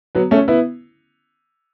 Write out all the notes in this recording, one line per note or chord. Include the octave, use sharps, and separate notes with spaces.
F#3 B3
A3 C#4
B3 E4